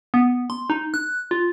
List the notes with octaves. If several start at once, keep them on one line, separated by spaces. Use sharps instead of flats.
B3
C6
D#4
F#6
F4